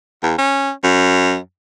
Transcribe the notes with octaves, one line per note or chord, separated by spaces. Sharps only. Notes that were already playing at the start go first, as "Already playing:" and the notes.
E2
C#4
F#2